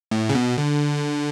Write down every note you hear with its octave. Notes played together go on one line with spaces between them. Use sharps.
A2
C#3
B2
D3